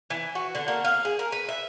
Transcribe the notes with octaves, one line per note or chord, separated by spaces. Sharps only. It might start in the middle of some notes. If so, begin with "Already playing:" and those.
E3
F#4
D3
A#3
F5
G#4
A#4
B4
E5